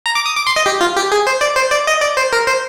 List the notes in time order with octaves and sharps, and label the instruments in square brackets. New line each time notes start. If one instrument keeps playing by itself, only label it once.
[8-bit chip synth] A#5
D6
D#6
D6
C6
D#5
G4
F4
G4
G#4
C5
D5
C5
D5
D#5
D5
C5
A#4
C5